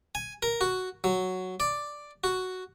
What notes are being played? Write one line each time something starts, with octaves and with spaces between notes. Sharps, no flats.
G#5
A#4
F#4
F#3
D5
F#4